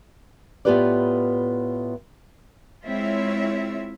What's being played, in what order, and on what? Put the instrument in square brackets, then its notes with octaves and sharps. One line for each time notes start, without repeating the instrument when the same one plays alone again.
[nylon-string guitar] A2 B3 F4 G4 B4 D5
[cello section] G#3 C4 E4 F4 C#5 E5